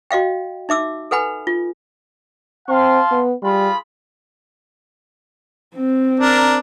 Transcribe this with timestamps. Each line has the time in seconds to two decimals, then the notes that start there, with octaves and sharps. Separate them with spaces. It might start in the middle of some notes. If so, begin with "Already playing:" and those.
0.11 F#4 D#5 F5 G5
0.69 D#4 E5 D6 E6
1.11 A4 B4 F#5 G#5 B5
1.47 F4
2.69 C4 F5 A5 C6
3.11 B3
3.43 G3 F4 G#4 B5
5.75 C4
6.20 D4 A#4